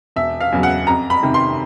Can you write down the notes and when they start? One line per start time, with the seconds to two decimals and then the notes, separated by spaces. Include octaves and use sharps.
0.16 E1 E5
0.40 F5
0.52 E2 C#3 F#3
0.63 F#5
0.87 F2 A#5
1.10 B5
1.23 C3 D#3
1.34 C6